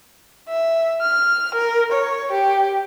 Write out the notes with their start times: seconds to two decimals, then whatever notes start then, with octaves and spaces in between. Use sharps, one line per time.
0.49 E5
1.01 F6
1.54 A#4
1.91 C#5
2.31 G4